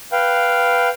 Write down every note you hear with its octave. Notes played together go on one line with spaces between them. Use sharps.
B4 F5 G5